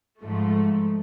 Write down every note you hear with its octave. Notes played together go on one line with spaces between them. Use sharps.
G#2 F3 A3